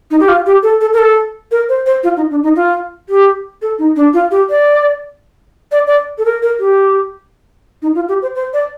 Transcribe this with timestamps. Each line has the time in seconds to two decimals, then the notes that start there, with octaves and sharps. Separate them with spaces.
0.11 D#4
0.20 G4
0.28 F4
0.46 G4
0.63 A4
0.81 A4
0.93 A#4
0.99 A4
1.51 A#4
1.69 C5
1.86 C5
2.03 F4
2.17 D#4
2.30 D4
2.43 D#4
2.56 F4
3.09 G4
3.62 A4
3.79 D#4
3.96 D4
4.14 F4
4.31 G4
4.50 D5
5.72 D5
5.87 D5
6.18 A4
6.25 A#4
6.42 A#4
6.59 G4
7.82 D#4
7.95 F4
8.09 G4
8.22 C5
8.35 C5
8.53 D5